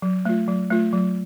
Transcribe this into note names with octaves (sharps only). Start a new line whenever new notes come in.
F#3
A3 F4
F#3
A3 F4
F#3